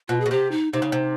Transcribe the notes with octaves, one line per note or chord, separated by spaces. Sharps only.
B2 F4
G#4
B2
C3 G4
D#4
C3 D#4
C#3
C3